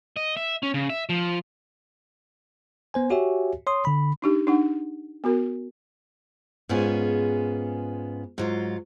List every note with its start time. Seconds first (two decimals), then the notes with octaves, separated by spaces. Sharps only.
0.16 D#5
0.37 E5
0.63 C#4
0.74 C#3
0.90 E5
1.09 F3
2.94 B3 C5 G#5
3.10 F#4 G4 C#5 E5 G#5
3.67 C#5 C6 D#6
3.85 D3 B5
4.22 D4 D#4 G4
4.47 D4 D#4 F#5
5.24 B3 F#4 A#4
6.69 G#2 B3 C#4 F4 G#4 G#5
8.38 G#2 F#3 F4